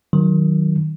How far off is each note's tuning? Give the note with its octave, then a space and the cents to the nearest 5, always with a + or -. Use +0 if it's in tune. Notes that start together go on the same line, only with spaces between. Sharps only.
D#3 +0 F#3 +0